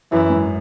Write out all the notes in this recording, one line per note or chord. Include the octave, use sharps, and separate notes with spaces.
F#2 E3
G#2